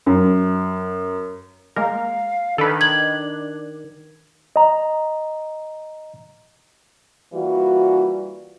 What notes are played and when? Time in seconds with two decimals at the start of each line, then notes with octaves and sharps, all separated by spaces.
0.06 F#2
1.76 G#3 A#3 A#4 F5
2.58 D#3 D4 A4 B4
2.81 G#6 F#7
4.56 D#5 A#5
7.33 E3 G3 A#3 F4 F#4